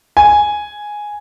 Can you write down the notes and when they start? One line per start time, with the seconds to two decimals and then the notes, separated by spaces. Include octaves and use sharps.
0.17 G#5